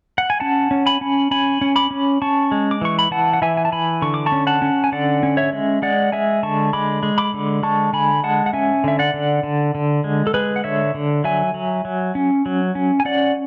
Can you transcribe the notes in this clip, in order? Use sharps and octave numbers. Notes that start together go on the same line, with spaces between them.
F#5
G#5
C#4 F#5 A5
C#4
G#5 B5
C#4
C#4 G#5 B5
C#4
B5 D6
C#4
C#4 A5 C#6
G#3
D6
E3 C#6
B5
E3 F#5 A5
F#5
E3 E5 G#5
G#5
A5
E3 G#5 B5
D3 C#6
D6
A5 C#6
C#4
F#5 A5
C#4
G#5
D3 D5 F#5
C#4
C#5 E5
G#3
G#3 D5 F#5
G#3 E5 G#5
D3 A5 C#6
G#3 B5 D6
G#3
B5 D6
D3
G#3 A5 C#6
D3 G#5 B5
G#3 F#5 A5
F#5
C#4 E5 G#5
D3 E5
D5 F#5
D3
D3
D3
G#3
A4
G#3 G#4 B4
F#5
D3 C#5 E5
D3
F#3 E5 G#5
F#3
F#3
C#4
F#3
C#4
G#5
C#4 D5 F#5